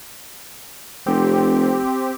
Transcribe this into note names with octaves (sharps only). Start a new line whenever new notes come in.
F1 C4 G4